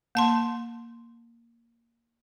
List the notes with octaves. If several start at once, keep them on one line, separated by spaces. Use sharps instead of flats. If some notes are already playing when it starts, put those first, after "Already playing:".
A#3 A5 C6